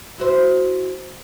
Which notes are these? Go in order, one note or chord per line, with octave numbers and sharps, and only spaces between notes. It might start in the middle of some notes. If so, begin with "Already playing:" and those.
E4 F#4 C5